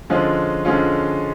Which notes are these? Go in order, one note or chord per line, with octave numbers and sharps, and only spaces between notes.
D3 F3 G#3 C#4 F4
D3 F3 G#3 C#4 F4